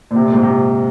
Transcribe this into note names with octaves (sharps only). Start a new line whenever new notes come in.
A#2
C3
A#2
G#2
C3